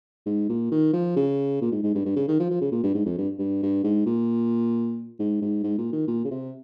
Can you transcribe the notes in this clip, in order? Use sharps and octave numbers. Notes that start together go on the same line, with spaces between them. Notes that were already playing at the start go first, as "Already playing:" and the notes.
G#2
A#2
D#3
F3
C#3
A#2
G#2
G#2
G2
G2
C#3
D#3
F3
F3
C#3
A#2
G2
G#2
F2
G2
G2
G2
G#2
A#2
G#2
G#2
G#2
A#2
D#3
A#2
C#3
C3